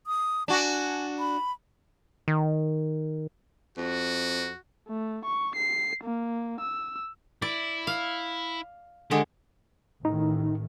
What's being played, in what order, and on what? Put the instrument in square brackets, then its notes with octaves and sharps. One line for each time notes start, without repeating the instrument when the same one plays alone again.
[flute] D#6
[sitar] D4 F#4 [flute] G#5
[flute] B5
[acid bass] D#3
[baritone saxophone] F2 [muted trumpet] F#4
[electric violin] A3
C#6
C7
A#3
E6
[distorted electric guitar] E4 [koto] D5
[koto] F5
[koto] D3 G#3 [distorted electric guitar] G4
[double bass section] A1 A2 D#3 [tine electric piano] D#4